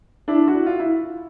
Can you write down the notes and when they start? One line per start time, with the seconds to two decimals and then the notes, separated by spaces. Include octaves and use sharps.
0.28 D4 E4
0.47 E4 F#4
0.66 F4
0.80 E4